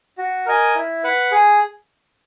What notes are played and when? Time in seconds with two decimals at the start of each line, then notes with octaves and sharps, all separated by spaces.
0.18 F#4
0.46 A#4 D#5 G#5
0.75 E4
1.04 B4 F#5
1.31 G#4